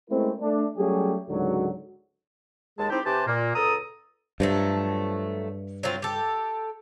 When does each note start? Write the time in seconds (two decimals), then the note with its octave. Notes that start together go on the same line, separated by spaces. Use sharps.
0.10 G#3 A3 C4 C#4 E4 A#4
0.41 A3 D4
0.77 F#3 G3 A3 C#4 G4 G#4
1.29 C#2 G#2 D3 F#3
2.78 D#2 G#3 G#4 A5
2.90 C4 D#4 E4 G4
3.05 C3 G4 B4 C5 G#5 A5
3.27 A#2 A#3
3.55 C#2 A4 A#5 D#6
4.40 G2 F3 F#3 A3
5.83 F#3 C4 F4
6.02 G4 A4